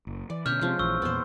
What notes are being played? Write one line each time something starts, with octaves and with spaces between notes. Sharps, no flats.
F#1
E3 D5
B2 D3 C#4 E5 F6 G6
C3 F3 G#3 A#3 C4
A#1 D#3 E3 C#6 E6
E2 A#2 B3 C5